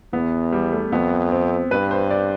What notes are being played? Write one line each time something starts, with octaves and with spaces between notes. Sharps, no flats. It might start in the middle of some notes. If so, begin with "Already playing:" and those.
E2 B3
G3
A3
F2 B3
C4
G2 B4
C5
D5